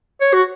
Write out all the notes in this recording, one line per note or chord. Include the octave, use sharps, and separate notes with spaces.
C#5
F#4